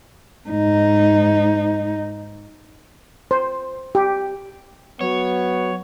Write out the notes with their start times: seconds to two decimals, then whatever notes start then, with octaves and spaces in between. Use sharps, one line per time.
0.50 G#2 D#4
3.31 C5
3.95 G4
5.01 F#3 B3 C#5